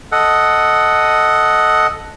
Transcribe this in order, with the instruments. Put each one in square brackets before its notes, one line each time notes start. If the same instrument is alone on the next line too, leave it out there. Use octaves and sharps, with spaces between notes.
[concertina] A4 D#5 F#5